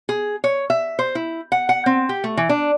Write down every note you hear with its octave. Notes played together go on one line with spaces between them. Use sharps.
G#4
C#5
E5
C5
E4
F#5
F#5
C4
G4
A3
E3
D4